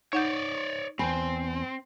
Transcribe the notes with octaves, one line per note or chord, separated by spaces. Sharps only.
D#4 C#5 D5 F#5 G6
E2 C4 G#5 B5